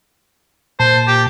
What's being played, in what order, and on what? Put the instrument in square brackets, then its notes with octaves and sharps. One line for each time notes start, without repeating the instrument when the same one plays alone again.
[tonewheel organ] A#2 A5 [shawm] C5
[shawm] G4